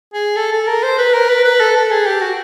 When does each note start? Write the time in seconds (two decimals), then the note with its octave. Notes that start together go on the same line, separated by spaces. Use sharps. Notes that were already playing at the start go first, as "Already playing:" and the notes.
0.13 G#4
0.37 A4
0.52 A4
0.67 A#4
0.83 C5
0.98 B4
1.14 A#4
1.29 B4
1.45 B4
1.60 A4
1.76 A4
1.91 G#4
2.07 G4
2.22 F#4